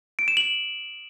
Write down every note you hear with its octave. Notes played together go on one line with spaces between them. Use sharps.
D7
E7
F#7